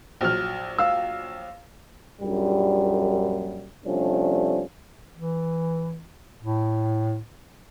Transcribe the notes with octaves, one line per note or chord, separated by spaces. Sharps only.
A#1 F#3 F6
F5 E6
A#1 F#2 G3
C3 F3 G3 A3 C#4 D4
E3
A2